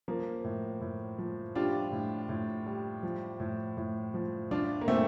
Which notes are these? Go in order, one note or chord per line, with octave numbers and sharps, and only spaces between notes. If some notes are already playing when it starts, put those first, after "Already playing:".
F3 A#3
A2
A2
F3
G3 D4 F4
A2
A2
G3
F3
A2
A2
F3
F3 D4 F4
A#3
A#2 A3 C4